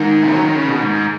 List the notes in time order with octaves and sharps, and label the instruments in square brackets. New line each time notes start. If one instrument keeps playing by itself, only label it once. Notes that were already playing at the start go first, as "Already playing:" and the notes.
Already playing: [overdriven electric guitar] G#2 [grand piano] D#3
[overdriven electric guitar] F#3
D#3
C#3
B2
G#2